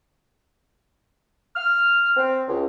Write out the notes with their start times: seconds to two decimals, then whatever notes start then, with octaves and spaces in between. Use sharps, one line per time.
1.56 F6
2.17 C4
2.48 C#2